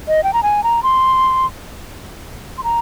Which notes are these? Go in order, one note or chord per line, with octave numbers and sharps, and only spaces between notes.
D#5
G5
A#5
G#5
A#5
C6
C6
A#5